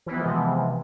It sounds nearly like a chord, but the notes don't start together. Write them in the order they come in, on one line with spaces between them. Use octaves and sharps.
E3 B3 F3 G#3 C3